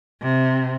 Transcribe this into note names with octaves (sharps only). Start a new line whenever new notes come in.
C3